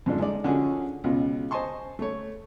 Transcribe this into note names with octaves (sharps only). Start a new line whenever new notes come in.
F2 G#2 F3 D4
G#3 D#4 D5
D3 F3 C#4 D#4 F#4 G#4
C#2 B2 F4
C5 D#5 G#5 A5 C6 C#6
A3 C#5